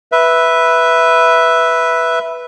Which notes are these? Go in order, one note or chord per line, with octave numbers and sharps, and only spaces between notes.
B4 E5